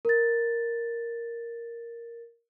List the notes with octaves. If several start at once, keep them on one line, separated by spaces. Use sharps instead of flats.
A#4 A6